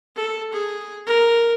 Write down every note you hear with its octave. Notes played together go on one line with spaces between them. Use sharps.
A4
G#4
A#4